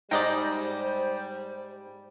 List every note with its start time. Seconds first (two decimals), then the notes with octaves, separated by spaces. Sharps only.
0.11 G#2 G3 D#4 C5 D5 D#5 G5